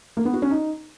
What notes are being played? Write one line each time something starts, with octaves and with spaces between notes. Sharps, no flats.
A#3
B3
F#4
C#4
D#4